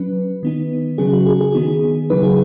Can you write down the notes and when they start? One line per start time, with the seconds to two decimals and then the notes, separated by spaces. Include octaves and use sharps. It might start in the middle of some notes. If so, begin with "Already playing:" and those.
Already playing: F#3 C#4 B4
0.43 D#3 B3 D#4
0.98 C#3 F#3 C#4 G#4
1.13 F#4
1.26 G#4
1.41 G#4
1.54 D#3 B3 D#4
2.10 C#3 F#3 D#4 B4
2.23 G#4